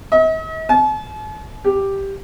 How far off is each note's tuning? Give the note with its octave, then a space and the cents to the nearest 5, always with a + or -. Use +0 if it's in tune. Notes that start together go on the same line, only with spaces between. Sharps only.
D#5 +45
A5 -45
G4 +0